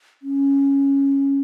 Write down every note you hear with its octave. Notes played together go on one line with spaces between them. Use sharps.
C#4